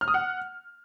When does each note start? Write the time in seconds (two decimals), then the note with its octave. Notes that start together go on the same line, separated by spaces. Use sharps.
0.01 F6
0.08 D#6
0.14 F#5